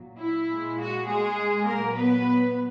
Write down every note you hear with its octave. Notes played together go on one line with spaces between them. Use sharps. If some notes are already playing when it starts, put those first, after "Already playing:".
Already playing: A#2 F#3
E4
A#2 G#3
F#4
G#3 G#4
A#2 F#3 A#3 A#4
B3 B4